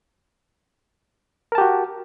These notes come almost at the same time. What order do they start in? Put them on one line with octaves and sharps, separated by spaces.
A#4 A5 G4 F#4